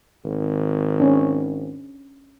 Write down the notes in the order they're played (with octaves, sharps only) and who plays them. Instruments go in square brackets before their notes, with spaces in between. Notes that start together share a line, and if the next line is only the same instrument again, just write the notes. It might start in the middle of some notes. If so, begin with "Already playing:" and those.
[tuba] G#1
[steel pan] C#4 D4